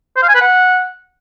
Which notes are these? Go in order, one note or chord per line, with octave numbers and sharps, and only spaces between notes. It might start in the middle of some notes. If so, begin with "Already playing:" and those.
C5
F5
G#5
B4
F#5